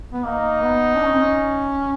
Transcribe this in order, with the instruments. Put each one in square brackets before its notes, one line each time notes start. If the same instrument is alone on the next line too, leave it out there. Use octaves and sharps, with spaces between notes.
[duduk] B3
[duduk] A#3 [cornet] D#4
[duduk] B3
D4
C#4
C4
C#4